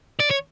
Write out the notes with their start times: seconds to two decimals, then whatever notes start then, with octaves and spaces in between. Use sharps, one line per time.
0.20 D5
0.30 C#5